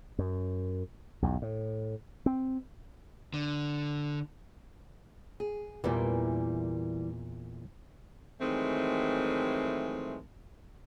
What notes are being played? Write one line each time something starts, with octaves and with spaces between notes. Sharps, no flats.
F#2
B1 E2
A2
C4
D3
G#4
E2 A#2 E3 G3 A#3
D#3 E3 F#3 G#3 A3 C4